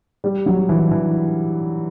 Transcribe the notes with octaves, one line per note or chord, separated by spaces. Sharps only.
G3
F#3
E3
E3